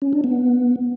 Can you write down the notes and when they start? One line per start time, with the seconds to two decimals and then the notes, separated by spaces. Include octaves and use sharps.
0.02 C#4
0.13 D4
0.24 B3